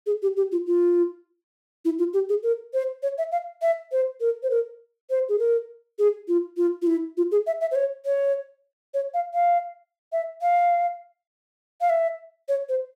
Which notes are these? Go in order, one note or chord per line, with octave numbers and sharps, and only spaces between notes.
G#4
G4
G4
F4
F4
E4
F4
G4
G#4
A#4
C5
C#5
E5
F5
E5
C5
A#4
C5
A#4
C5
G#4
A#4
G#4
F4
F4
F4
E4
F4
G#4
E5
E5
C5
C#5
C#5
C#5
F5
F5
E5
F5
F5
E5
C#5
C5